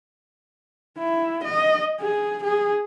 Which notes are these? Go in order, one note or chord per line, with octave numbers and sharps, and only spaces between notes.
E4
D#5
G#4
G#4